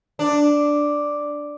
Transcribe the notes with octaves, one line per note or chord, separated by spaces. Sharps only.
D4